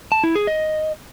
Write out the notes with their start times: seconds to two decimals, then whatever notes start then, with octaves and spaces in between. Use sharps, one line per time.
0.12 A5
0.24 E4
0.35 G#4
0.47 D#5